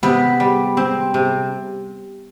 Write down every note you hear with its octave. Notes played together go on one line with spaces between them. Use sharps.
C3 B3 B4
G3
C4
C3